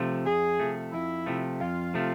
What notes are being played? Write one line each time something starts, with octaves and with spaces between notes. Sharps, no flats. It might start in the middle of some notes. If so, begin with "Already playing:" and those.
Already playing: C3 F3 A3
F2 G#4
C3 F3 A3
F2 E4
C3 F3 A3
F2 F4
C3 F3 A3